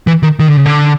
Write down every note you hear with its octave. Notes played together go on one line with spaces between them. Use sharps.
E3
D#3
D#3
D3
C#3
D3